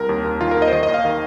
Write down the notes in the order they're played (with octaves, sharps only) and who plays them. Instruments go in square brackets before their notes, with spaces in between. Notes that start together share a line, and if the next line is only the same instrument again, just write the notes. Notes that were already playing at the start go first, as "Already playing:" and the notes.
Already playing: [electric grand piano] C2 A#4
D#2
D#2
D#3 F4
A#4
D#2
D#5
C5
D#3 D#5
D#5
D#2
F5
D#3